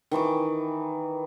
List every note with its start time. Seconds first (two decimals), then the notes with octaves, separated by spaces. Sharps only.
0.11 D#3 E3 C#6 D6